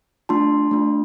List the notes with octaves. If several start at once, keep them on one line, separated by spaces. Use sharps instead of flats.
A3 D4 F4 A5 C6
A3 D4 F4